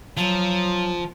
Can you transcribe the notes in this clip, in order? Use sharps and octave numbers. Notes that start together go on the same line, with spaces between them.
F3 F#3